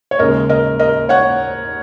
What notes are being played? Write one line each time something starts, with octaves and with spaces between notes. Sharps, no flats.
C#5
D#2 C#3 G#3 A#4 D#5
A#4 D#5
A#4 D#5
C#5 F#5